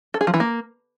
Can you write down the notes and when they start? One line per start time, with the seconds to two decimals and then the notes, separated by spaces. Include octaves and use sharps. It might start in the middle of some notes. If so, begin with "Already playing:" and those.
0.14 A4
0.21 G#4
0.27 F3
0.34 E3
0.40 A#3